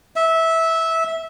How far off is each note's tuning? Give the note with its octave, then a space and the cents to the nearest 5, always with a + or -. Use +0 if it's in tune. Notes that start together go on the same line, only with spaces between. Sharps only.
E5 -15